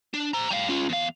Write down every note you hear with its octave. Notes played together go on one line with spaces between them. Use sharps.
D4
C5 A#5
G3 F5
C#4 F4
E2 F5